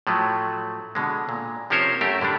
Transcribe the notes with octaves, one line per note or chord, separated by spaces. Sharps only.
A2 F3 F#3 A3
B2 D3 G#3
A#2
C3 F3 C#4 A#4 C5 C#5
F#2 A3 G4 A#4
A2 D3 G3 D4